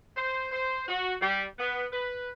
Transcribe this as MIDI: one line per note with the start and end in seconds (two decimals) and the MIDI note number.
0.17 0.48 72
0.51 0.83 72
0.88 1.14 66
1.21 1.44 55
1.59 1.86 59
1.92 2.29 71